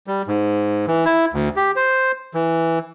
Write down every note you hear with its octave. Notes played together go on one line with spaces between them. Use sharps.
G3
G#2
E3
E4
D2
G4
C5
E3